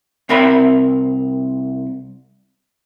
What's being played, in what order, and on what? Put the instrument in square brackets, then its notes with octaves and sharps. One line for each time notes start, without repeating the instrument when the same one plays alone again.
[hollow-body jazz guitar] C2 C4 A#4 E5 B5